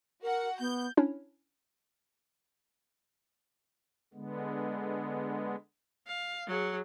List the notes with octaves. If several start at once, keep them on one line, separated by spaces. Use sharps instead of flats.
F#4 A#4 F#5
B3 G6
C#4 D4 E4 C#5
D3 G#3 B3
F5
F#3 G#4